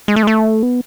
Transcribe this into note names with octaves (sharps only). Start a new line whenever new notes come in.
G#3
A3
G#3
A3
B3